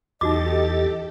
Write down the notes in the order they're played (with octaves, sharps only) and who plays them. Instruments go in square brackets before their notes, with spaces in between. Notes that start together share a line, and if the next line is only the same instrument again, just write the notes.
[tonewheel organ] E2 A6 [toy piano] D#4 F#4 D6 [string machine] G4 A4 [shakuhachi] D#5